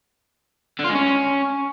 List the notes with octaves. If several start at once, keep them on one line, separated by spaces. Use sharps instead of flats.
D3
F4
G#3
C#4